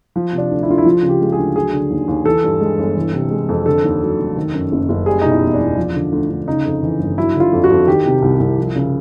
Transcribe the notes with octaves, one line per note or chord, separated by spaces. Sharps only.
F3
C3
D4
D2
E4
D2 F4
E4
F3 F4
C#3
G4
G#3
G#4
D2
F#3 G#4
D3
D#2
D#2
E3 A4
G2
G#3
G1
E3
C3
G#3
F2
D3 A4
D#2
F#3
F1
D#3
F#2
F#1
F#1
G3 G#4
B2 D#4
E4
E2
D4
E2
F3
D3
D2
D2
C#3 D#4
F2
E3
G1
F#3 E4
D3 F4
F2
F#4
F2
D#3 G4
C3
C2
C2
F3
C#3